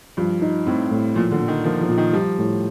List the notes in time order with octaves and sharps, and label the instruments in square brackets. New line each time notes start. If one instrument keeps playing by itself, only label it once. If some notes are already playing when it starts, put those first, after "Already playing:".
[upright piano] G2 [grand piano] F3
[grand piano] D#4
[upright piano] A2 [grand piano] C4
[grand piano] A2
[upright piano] A#2 [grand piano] F3
[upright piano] D3
[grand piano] A#2
[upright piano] D#3
[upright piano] F3 [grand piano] A#3
[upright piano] F3
[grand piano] A#2
[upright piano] D#3
[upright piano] F3 [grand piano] G3
[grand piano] A2